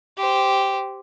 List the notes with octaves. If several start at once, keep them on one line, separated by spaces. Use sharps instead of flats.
G4 C5